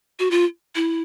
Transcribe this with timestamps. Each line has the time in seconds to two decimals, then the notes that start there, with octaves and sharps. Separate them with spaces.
0.19 F#4
0.31 F4
0.75 E4